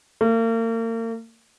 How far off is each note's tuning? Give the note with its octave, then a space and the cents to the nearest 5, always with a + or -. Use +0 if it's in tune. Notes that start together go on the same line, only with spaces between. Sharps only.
A#3 -40